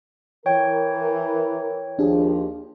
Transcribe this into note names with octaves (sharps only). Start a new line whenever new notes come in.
E3 A#4 C#5 G5
D#2 F3 D4 G4 G#4